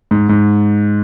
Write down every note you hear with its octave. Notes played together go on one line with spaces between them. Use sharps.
G#2
G#2